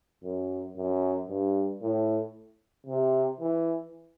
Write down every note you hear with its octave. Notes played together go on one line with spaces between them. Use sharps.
F#2
F#2
G2
A2
C3
E3